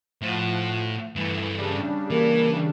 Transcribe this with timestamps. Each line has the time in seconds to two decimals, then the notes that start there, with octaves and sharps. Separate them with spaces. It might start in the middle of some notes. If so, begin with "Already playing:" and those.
0.21 A2 F3 F#5
1.16 G2 E3 A3
1.57 C#3 G3 D4
2.11 E3 A#3